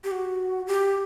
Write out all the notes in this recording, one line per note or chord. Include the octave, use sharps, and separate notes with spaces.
G4
F#4
G4